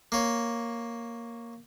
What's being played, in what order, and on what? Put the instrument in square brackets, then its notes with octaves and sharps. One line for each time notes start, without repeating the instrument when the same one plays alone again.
[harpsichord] A#3 C#5